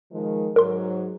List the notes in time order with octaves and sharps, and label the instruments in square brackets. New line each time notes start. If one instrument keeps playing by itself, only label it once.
[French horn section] D#3 F3 G#3
[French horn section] G#2 F#3 [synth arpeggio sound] A#4 C6